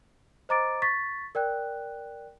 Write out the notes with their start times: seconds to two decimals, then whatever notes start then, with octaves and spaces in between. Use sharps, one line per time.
0.49 C5 D#5 A#5 D6 A6 D7
0.82 C#6 A6 B6
1.35 A#4 D5 G5 F#6